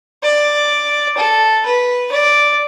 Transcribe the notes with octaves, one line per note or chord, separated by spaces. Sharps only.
D5
A4
B4
D5